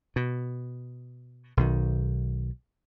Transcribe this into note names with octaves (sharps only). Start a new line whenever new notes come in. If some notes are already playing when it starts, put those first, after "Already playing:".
B2
B1 D#3